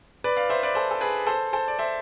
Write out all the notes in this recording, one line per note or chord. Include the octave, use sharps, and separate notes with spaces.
B4 D5
D5 F5
C5 E5
B4 D5
A4 C5
A4
G#4 B4
A4 C5
A4 C5
D5
C5 E5